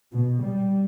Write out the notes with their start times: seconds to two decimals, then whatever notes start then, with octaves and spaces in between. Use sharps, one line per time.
0.12 B2
0.44 G3